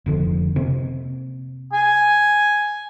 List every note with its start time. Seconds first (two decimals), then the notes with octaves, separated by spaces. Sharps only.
0.06 F1 D3 F3
0.56 C3 A#3 C4
1.73 G#5